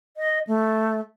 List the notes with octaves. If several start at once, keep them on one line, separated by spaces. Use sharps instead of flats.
D#5
A3